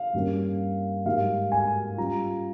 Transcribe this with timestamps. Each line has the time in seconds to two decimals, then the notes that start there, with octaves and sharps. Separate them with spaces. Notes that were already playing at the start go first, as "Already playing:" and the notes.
Already playing: F5
0.13 G2 G3 A#3 C#4
1.06 G#2 G3 A#3 D#4 F5
1.52 G#5
1.97 G3 C#4 F4 A#5